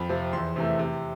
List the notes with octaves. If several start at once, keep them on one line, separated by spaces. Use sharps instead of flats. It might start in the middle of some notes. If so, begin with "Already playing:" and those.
Already playing: F2 B5
C3 F3
E2 C6
C3 E3 A3
C3